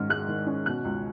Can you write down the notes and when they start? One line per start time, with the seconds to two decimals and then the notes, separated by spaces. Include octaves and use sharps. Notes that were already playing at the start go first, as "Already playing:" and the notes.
Already playing: G#2 D#3 C#4 F6
0.09 G#3 F#6
0.28 D#3
0.47 C#4
0.66 B2 F#6
0.85 C#2